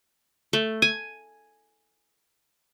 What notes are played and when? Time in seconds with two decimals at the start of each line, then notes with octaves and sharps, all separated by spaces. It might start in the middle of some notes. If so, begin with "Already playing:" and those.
0.53 A3
0.82 G#5